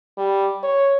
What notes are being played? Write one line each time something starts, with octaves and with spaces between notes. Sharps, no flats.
G3
C#5